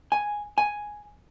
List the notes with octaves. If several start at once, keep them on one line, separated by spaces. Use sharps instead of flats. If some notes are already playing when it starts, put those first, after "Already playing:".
G#5
G#5